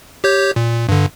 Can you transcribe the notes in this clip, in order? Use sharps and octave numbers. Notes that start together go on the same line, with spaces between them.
G4 C#5 G6
A#2
G2 D3